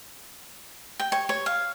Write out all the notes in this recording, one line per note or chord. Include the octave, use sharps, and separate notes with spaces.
G5
C#5
C#5
F5